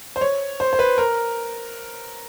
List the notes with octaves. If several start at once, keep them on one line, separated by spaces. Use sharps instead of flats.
C5
C#5
C5
C5
B4
A#4